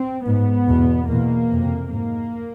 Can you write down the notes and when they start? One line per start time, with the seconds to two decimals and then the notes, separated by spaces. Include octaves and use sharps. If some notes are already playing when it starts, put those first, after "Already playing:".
Already playing: C4
0.25 G#2 B3
0.68 E2 B2
1.08 E2 B2 A#3
1.50 F2 C3
1.91 G#2 A#3